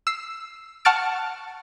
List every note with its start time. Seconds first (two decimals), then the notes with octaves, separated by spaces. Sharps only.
0.07 E6 C7
0.85 F#5 A5 C#6 F6 A6 D7